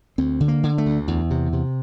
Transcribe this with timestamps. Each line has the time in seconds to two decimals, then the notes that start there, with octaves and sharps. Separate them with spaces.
0.18 D2 C4
0.40 D3
0.48 A#3
0.63 D3
0.78 A3
0.86 D2
1.08 E2
1.30 C3
1.53 C3